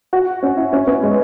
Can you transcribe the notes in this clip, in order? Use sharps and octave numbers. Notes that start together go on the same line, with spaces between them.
F#4
C#4
E4
C#4
B3
G#3